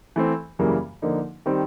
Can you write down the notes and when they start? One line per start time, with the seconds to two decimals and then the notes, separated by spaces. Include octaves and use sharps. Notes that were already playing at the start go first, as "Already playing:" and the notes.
0.16 E3 A3 C4
0.59 F#2 C#3 E3 G3 A#3
1.02 D3 F3 A#3 D#4
1.46 D#3 G3 C4